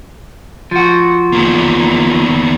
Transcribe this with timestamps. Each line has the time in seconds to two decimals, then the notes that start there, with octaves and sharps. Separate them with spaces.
0.71 F3 F#4
1.32 E2 A#3